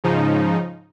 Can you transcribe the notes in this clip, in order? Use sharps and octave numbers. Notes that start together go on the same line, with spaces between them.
G#2 C#3 F3 D#4